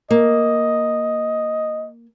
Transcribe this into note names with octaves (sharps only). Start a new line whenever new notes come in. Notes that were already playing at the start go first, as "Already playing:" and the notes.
A#3 D#5